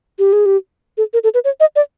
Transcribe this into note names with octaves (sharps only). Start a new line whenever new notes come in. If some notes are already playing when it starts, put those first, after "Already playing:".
G4
G#4
G4
A4
A#4
A4
B4
C#5
D#5
D5